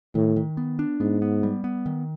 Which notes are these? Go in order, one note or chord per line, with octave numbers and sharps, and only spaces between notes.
A2 D#3
D#3
B3
D4
G#2 B3
B3
G3
B3
D#3